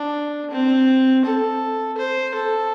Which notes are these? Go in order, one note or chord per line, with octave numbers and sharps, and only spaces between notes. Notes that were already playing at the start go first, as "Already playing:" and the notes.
Already playing: D4
C4
A4
C5
A4